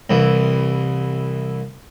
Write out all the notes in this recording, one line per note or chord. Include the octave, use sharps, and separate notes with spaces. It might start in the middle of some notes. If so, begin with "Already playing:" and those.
C2 E3